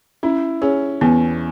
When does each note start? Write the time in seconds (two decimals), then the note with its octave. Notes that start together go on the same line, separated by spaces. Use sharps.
0.23 C#4 E4
0.62 C#4 G#4
1.01 E2 B3